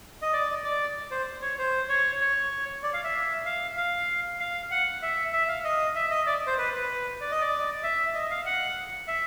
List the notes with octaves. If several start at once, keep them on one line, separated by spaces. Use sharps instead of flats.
D#5
D5
D5
C5
C#5
C5
C#5
C#5
D5
F5
E5
F5
F5
F5
F#5
E5
E5
F5
D#5
E5
D#5
D5
C5
B4
B4
D5
D#5
D5
E5
D#5
F5
F#5
E5